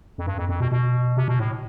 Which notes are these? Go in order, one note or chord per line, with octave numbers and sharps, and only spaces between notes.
F2
G2
F2
F2
B2
B2
C3
B2
A2